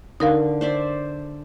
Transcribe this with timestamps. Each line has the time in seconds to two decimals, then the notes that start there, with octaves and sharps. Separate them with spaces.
0.20 D3 D#4 A#4 F5
0.61 C5 D5 E5